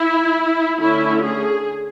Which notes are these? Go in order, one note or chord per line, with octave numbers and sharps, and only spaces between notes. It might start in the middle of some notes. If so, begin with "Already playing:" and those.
Already playing: E4
D3 A3 C#4 E4
G#4